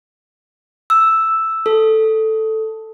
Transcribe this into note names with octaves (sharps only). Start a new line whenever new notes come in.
E6
A4